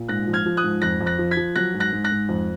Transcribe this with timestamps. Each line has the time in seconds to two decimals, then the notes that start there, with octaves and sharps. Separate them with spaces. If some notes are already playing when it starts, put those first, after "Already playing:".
Already playing: A#2
0.08 G#2 F#6 A#6
0.27 F3
0.33 F6 G#6
0.46 F3
0.57 D#6 F#6
0.63 G#2
0.82 F2 F#6 A#6
1.01 F2
1.06 F#6 A#6
1.19 F3
1.31 G#6 B6
1.37 F3
1.56 F#3 F#6 A#6
1.74 G#2
1.80 F#6 A#6
1.92 G#2
2.04 F#6 A#6
2.11 G#2
2.29 F2